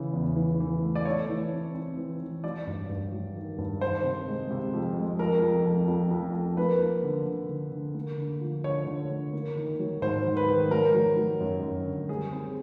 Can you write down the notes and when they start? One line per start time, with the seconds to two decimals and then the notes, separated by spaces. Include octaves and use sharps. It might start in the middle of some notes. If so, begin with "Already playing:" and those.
Already playing: C#3 E3
0.13 E2
0.36 E3
0.60 E3
0.83 A3
0.95 D5
1.05 A3 C#5
1.29 E3
1.52 C4
1.75 C4
1.97 E3
2.20 E3
2.44 F#3 D5
2.67 G2
2.89 G2
3.12 F#3
3.36 D#3
3.58 G2
3.81 D#3 C5
4.04 C3
4.28 G#3
4.51 C3
4.74 F2
4.96 G#3
5.19 F2 A#4
5.42 F2
5.66 F2
5.88 F2
6.11 F2
6.34 F2
6.57 A#3 B4
6.80 A#3
7.04 D3
7.26 D3
7.49 D3
7.72 D3
7.95 A#3
8.18 D3
8.41 F3
8.64 D3 C#5
8.87 D3
9.10 D3
9.33 A#3
9.56 D#3
9.79 F#3
10.02 G#2 C5
10.25 D#3
10.37 B4
10.48 D#3
10.71 F#3 A#4
10.94 F#3
11.17 F#3
11.41 F#2
11.63 F#2
11.86 D3
12.09 G3 G#4
12.32 C4